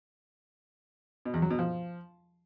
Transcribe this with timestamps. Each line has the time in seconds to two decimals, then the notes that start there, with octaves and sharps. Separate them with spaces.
1.25 B2
1.34 E2
1.42 F#3
1.50 B2
1.59 F3